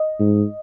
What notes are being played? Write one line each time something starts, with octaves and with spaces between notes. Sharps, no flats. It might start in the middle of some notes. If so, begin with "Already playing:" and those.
Already playing: D#5
G#2